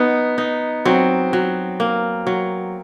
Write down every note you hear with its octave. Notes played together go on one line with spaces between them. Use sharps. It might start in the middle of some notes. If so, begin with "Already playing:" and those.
Already playing: B3 D#4
D#4
F#3 C4
F#3
A#3
F#3